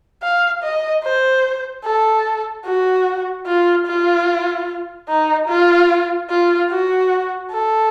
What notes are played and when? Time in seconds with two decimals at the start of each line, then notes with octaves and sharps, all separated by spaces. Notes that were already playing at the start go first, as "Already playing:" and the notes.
0.22 F5
0.63 D#5
1.04 C5
1.85 A4
2.65 F#4
3.47 F4
3.87 F4
5.09 D#4
5.49 F4
6.30 F4
6.71 F#4
7.52 A4